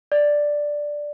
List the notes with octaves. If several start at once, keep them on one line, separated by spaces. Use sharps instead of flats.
D5